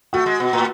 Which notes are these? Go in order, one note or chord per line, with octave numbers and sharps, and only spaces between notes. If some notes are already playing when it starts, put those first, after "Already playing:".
A3 F#4
G#3
B2
A2